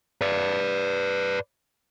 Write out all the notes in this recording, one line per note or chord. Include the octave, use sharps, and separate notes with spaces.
B4 D5